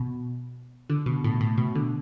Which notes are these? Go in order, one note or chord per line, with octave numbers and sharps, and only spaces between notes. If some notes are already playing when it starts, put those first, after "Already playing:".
Already playing: B2
D3
B2
A2
A2
B2
D3